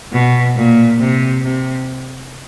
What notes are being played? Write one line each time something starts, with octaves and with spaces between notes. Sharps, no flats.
B2
A#2
C3
C3